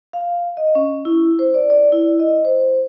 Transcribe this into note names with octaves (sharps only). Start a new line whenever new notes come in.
F5
D#5
C#4
E4
C5
D5
D5
E4
D#5
C5